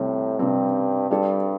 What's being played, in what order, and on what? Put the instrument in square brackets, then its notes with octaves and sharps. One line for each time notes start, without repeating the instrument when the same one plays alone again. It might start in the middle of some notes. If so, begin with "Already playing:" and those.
Already playing: [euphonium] A2 [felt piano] C3 G3 C4
[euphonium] G2 [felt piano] C3 G3 C4
[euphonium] G2 [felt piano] G3 D4 A4